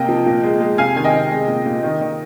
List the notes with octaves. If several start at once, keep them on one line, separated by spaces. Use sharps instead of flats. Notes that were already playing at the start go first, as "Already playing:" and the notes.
Already playing: C3 A#3 D#5 G5
F3
A#2
G#3
G#3
C3 F5 G#5
D#3 G#5
D#5 G5
C3
G#3
A#2
A#2
D#3
D#3